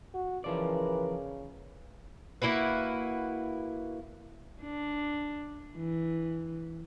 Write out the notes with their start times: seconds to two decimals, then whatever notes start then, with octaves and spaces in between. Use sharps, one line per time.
0.14 F#4
0.44 C#3 E3 F3 E4 A#4 B4 D5
2.42 A#3 E4 F#4 B4
4.62 D4
5.77 E3